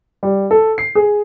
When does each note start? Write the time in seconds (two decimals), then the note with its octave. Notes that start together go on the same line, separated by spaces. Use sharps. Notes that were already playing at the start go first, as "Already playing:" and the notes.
0.23 G3
0.51 A4
0.78 C7
0.95 G#4